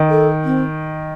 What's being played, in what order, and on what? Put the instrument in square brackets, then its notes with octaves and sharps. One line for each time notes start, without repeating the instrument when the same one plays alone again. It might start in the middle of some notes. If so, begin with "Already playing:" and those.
Already playing: [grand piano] D#3
[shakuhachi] A4
C4